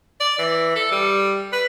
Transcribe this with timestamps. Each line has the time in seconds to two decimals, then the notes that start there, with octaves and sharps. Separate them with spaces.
0.20 D5
0.39 E3
0.76 A4
0.91 G3
1.53 B4